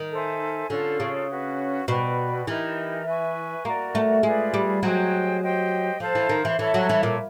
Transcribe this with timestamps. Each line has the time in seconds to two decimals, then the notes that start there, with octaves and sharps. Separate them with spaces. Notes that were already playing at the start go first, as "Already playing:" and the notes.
Already playing: D#3
0.11 A4 C5 E5 G#5
0.70 D3 C#4 F4 A4
1.00 C#3
1.29 C#4 F#4 B4
1.88 B2 F#4 B4 D5 G5
2.47 E3 D#4 G4 A#4
3.06 B4 E5 G#5 C#6
3.65 A#3 F#4 A#4 D5
3.95 A3
4.23 G#3 F4 G#4 B4 D5
4.54 G3
4.83 F#3 G#4 C5 D#5 G5
5.42 G4 C5 D#5 G5
6.00 F3 A4 C5 F5 A5
6.15 E3
6.29 D#3
6.45 E3
6.59 E3 A4 C#5 E5 A5
6.74 F#3
6.89 E3
7.03 A#2